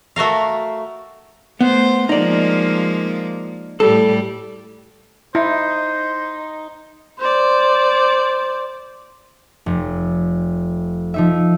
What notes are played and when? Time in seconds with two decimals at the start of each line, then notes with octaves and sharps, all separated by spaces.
0.16 A3 F#4 A#4 F5
1.61 A3 B3 C5
2.09 F3 G#3 A#3 D#4 D5
3.80 A2 G3 A4
5.35 D#4 E4 C5
7.19 C5 D5
9.66 F1
11.14 F3 D#4 E5